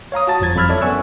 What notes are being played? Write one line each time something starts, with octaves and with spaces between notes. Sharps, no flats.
C#5 F5 A#5 D#6
F#4 A5 A6
G1 F2 F3 G#6 A6
F2 F#3 B5 E6 F6 G#6
E4 A4 C#5 D5 E5
F#2 B3 G#5 C#6 E6 F#6